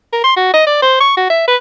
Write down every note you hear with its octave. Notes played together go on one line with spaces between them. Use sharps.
A#4
C6
F#4
D#5
D5
C5
C#6
F#4
E5
B4